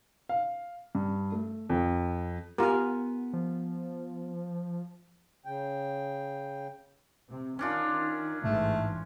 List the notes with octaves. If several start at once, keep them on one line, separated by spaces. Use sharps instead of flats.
F5
G2
A3
F2
B3 F4 G4 A#4 G#5
F3
C#3 G5
C3
D#3 C#4 D4 F4
A1 G#2 E3 G#3 A3